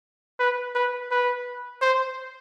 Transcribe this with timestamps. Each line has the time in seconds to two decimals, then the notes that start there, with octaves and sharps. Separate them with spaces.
0.40 B4
0.75 B4
1.11 B4
1.81 C5